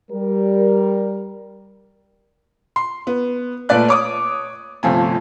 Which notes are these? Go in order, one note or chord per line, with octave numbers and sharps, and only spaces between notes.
G3 A#4
C6
B3
A#2 A3 B4 D5 F#6
C#5 D6 D#6
G1 C3 F3 A3 G#5